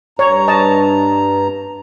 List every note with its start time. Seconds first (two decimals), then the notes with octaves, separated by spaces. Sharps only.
0.19 G2 C#5 A#5
0.48 D#5 A5